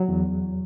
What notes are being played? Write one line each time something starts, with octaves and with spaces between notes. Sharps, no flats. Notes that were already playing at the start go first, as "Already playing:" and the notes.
Already playing: F#3
E2